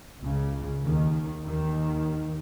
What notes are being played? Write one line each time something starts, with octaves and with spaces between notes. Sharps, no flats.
C#2 C#3
D#2 D#3
D#2 D#3